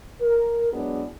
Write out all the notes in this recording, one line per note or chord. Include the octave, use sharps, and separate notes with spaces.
A#4
F#3 G#3 B3 D4 E4 G#4